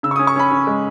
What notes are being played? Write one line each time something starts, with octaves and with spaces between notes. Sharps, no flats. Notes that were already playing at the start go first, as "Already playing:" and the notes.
C#3 E6
C#6
D#6
C#4
C#6
C#4 B5
C#4
G#3